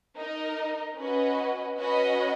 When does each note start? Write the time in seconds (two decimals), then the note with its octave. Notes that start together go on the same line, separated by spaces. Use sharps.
0.18 D#4 A#4 D#5
0.97 C#4 F#4 B4 D#5
1.78 C#4 F#4 B4 D#5